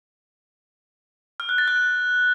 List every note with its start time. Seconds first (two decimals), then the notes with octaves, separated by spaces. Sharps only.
1.40 F6
1.49 F#6
1.58 A6
1.68 F#6